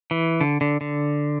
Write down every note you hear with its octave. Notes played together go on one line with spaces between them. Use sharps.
E3
D3
D3
D3